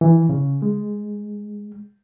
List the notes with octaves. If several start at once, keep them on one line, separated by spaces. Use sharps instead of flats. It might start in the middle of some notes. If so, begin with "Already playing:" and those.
E3
C#3
G#3